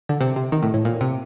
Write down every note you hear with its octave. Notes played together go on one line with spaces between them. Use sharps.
D3
C3
C3
D#3
A2
A2
A#2
C3